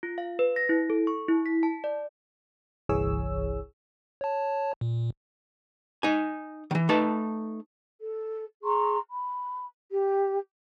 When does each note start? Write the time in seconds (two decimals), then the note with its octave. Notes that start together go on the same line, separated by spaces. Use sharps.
0.03 F4
0.18 F5
0.39 B4
0.56 A#6
0.69 E4
0.90 A4
1.07 C#6
1.29 E4
1.46 B6
1.63 A5
1.84 D5
2.89 G1 C2 E3 G#4 C#5 E6
4.21 C#5 A5
4.81 A#2
6.03 D#4 G#5
6.71 D#3 E3
6.89 A3 D#4 B4 A5
8.02 A4
8.63 G#4 A#5 C6 C#6
9.09 B5
9.90 G4